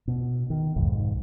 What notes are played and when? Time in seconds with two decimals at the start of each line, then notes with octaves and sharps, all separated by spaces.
0.08 B2
0.50 D#3
0.76 B1 F2 G#2